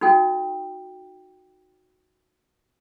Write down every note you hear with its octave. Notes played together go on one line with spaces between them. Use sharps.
D#4 F#4 A4 G5